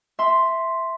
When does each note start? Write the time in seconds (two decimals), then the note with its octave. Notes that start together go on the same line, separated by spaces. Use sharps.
0.19 E5 C6